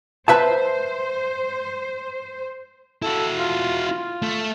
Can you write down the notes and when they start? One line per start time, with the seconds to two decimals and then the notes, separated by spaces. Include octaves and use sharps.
0.28 B4 C5 E5 A5
3.02 E4 F#4 A4
3.38 F4
3.86 F4
4.22 A3